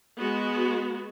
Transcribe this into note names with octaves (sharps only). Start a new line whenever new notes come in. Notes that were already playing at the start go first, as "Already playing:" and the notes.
G#3 B3 F#4